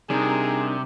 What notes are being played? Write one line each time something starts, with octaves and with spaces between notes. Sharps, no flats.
C3 G3 D4 D#4 G#4 A#4